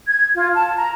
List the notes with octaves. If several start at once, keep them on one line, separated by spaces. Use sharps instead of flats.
G#6
F4
A5
A#5